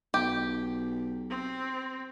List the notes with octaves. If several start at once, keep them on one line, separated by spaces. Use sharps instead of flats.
B1 G4
C4